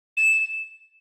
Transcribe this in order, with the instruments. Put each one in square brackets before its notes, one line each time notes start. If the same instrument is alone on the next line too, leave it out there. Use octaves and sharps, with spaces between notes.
[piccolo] E7